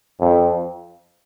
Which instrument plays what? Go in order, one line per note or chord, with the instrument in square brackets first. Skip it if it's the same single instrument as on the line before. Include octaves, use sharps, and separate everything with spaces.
[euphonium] F2